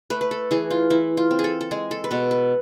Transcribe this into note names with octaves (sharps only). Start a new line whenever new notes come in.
A3 B4
B4
A4
E3 G#4
F4
E3 E4
F4
C4
G#4
A4
A4
G#3 G#4
A4
B4
B2 A4
B4